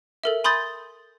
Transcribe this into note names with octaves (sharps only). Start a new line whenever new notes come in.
A4 A#4 E5
G#5 B5 C6 D#6 G6 A6